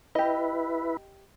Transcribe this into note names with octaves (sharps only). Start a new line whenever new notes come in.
E4 G4 B4 D#5